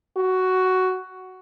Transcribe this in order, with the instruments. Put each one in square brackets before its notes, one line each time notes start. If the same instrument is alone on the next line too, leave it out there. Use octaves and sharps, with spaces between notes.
[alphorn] F#4